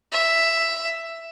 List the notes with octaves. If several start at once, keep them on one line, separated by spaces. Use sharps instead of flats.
E5